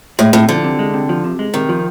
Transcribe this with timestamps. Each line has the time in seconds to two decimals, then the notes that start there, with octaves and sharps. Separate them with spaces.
0.19 A2 G#3
0.33 A2 C3
0.49 D3 F3
0.64 C3
0.79 G#3
0.94 C3
1.09 F3
1.24 C3
1.39 G#3
1.54 C3 D#3
1.69 F3